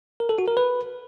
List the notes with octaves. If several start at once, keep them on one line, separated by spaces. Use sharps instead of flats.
A#4
A4
F#4
A#4
B4